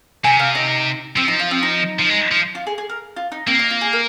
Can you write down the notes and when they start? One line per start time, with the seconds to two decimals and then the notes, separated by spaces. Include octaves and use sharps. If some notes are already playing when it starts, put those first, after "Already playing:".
0.24 C3 G#5
0.39 F5
0.55 D#4
1.16 F3 C4
1.28 D#4
1.39 F4
1.51 C4
1.63 D#4
1.99 F3
2.09 G#3
2.31 F3
2.55 F4
2.67 G#4
2.78 G#4
2.89 A#4
3.16 F4
3.32 D#4
3.47 A#3 C4
3.59 D#4
3.70 F4
3.81 G#4
3.93 A#4